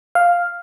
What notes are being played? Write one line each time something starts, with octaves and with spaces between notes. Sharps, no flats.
F5